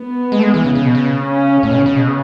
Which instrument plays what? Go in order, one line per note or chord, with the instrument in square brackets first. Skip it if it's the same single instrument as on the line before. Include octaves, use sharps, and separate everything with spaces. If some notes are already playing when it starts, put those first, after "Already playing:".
Already playing: [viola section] B3
[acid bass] G#3
A3
G#3
E3
C#3
C#3
B2
C#3
[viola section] C#4
[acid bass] A2
B2
C#3
C#3
B2
C#3